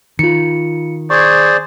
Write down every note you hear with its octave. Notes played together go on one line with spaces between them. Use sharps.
D#3 F4 C#7
G#4 C5 D5 C#6 G#6